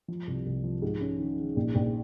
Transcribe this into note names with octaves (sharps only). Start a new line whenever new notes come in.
F3
C2
C2
F3
G#2
C#4
D#3
D#3
A#1
A#1